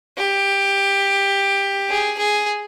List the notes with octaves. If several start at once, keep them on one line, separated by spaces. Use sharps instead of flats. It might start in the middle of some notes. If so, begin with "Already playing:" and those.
G4
G#4
G#4